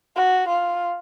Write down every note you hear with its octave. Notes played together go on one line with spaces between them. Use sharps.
F#4
F4